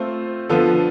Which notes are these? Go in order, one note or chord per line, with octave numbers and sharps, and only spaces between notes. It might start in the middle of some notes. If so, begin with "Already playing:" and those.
Already playing: A3 C4 F4 A4 C5
D3 F3 B3 F4 A4